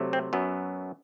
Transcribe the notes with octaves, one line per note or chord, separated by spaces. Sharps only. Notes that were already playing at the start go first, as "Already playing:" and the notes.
Already playing: C3 F#3 A3
C4
F#2 F#3 B3